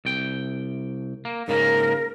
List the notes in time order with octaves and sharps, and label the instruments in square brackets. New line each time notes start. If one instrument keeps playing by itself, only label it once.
[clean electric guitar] C2 G5
A#3
[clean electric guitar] G#2 C#3 A#3 [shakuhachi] A#4